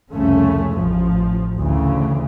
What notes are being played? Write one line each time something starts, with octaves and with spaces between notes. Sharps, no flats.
C2 F2 C#3 A3 C#4
A1 F3
D2 C#3 E3